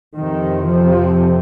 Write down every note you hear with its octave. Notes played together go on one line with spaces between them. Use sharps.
F2 C3 D#3
F3